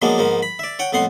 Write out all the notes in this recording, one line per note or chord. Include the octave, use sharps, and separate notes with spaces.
F3 F#3 G#3 A#3 B3 D4
G#2 F3 A#3 B3
B5
D5 E5
C#5 F#5 G5
F2 A2 B3 F#5 C6